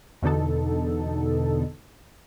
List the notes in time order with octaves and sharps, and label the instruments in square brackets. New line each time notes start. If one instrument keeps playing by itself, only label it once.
[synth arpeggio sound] E2 B2 D3 D#4 A4